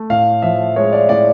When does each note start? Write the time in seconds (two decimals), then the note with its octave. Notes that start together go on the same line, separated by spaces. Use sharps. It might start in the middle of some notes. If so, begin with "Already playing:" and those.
Already playing: A3
0.10 A2 F5
0.42 F3 E5
0.76 G#3 C#5
0.93 D5
1.09 A2 D5